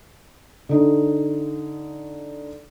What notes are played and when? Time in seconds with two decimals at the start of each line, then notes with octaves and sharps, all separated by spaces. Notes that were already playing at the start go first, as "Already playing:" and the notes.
0.69 D3 D#4